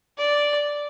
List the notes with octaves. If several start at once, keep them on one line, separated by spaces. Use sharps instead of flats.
D5